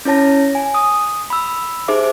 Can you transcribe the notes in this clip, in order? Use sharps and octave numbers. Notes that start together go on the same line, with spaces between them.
C#4 E4 C#5 A5 A#6
G#5
D#6
B5 E6
D#4 G4 G#4 C5 E5 D6